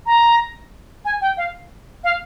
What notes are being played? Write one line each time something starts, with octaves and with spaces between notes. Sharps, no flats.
A#5
G#5
G5
F5
F5